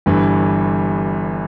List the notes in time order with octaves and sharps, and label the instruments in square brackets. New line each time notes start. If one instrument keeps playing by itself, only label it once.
[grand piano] G1 G2 E3